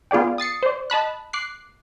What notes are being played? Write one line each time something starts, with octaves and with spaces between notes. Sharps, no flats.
B3 F4 G#4 D5 G5
D#6 A6 C7 C#7
C5 D5
D#5 A5 B5 F#6
D6 F#6 C7